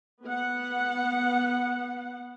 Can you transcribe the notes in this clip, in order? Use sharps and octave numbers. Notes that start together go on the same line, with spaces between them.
B3 F#5